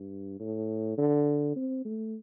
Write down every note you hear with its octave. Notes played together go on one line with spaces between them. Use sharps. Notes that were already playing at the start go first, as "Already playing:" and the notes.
Already playing: G2
A2
D3
C4
A3